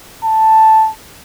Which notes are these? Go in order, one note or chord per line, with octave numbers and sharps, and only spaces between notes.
A5